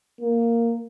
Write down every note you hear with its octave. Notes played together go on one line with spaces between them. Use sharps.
A#3